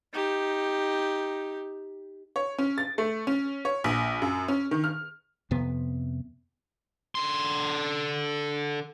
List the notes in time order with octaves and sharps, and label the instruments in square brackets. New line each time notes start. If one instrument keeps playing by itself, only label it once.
[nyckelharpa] D#4 G4
[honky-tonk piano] C#5
C#4
A6
A3
C#4
C#5
A#1
F#2
C#4
D#3
F6
[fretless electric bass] F2 C3 B3
[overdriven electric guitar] D3 C6